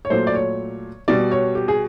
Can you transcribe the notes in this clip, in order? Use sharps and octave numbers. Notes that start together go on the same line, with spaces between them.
C#5
A#2 F#3 A3 C5
D5
C#5
B2 G3 D5
C#5
G4
G#4